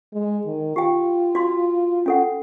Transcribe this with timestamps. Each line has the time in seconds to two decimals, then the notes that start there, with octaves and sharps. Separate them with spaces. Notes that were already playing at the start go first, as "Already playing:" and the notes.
0.13 G#3
0.46 D#3
0.76 F4 G4 G5
1.35 F#4 C6
2.06 C#4 A4 F#5